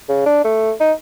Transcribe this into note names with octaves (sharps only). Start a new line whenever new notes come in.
C#3
D4
A3
D#4